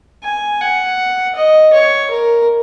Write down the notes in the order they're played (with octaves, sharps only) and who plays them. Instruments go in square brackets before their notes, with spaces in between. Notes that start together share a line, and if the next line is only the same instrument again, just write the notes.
[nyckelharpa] G#5
F#5
D#5
C#5
A#4